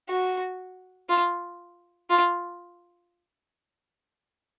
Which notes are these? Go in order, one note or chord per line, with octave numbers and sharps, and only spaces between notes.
F#4
F4
F4